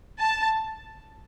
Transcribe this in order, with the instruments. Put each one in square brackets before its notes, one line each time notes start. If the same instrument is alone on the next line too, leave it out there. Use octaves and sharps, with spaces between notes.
[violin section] A5